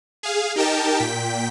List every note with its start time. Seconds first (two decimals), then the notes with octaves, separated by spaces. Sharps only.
0.23 G#4 F5
0.56 D#4 G4 A#4 G5 A5
0.99 A#2 G5 B6